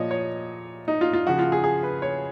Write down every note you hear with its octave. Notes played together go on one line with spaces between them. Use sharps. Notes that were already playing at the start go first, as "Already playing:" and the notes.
Already playing: A#2 F3 C#5 D#5
C#5
D#4
F4
F4
C#3 F3 F#4
F4
G#4
G#4
B4
C#5